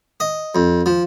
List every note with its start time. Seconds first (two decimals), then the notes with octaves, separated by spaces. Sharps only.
0.20 D#5
0.55 F2
0.86 F3